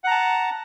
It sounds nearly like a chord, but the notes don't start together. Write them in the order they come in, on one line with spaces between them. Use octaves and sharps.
F#5 A#5 A5